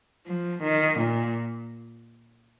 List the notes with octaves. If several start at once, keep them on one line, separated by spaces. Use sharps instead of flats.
F3
D#3
A#2